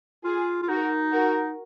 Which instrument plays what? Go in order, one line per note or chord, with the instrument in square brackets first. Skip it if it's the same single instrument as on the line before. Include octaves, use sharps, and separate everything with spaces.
[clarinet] F4 [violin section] G#4
[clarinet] F4
[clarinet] D#4 [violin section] F#4 A#4
[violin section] F#4 A#4